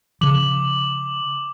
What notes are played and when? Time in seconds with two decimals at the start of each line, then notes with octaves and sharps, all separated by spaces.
0.21 C#3 F3 D6 F#7